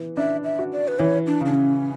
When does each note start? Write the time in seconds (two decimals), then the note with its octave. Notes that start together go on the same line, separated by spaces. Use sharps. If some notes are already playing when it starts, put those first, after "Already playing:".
Already playing: E3 B3
0.17 D4 E5
0.44 E5
0.59 F#4
0.72 D5
0.88 B4
0.99 E3 C#5
1.27 D4
1.41 C#3 D4
1.54 C#4